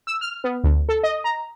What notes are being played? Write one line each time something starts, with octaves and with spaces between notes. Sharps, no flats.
E6
F6
B3
D2
A4
D#5
A#5